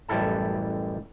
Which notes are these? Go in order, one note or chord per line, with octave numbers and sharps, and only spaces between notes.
A1 F#2 G3 E4 A4 A5